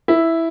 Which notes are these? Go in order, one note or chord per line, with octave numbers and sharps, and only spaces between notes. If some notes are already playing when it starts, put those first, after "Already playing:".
E4